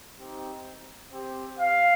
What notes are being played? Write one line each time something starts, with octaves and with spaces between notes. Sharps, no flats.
C4 D#4 G4
C4 G4
F5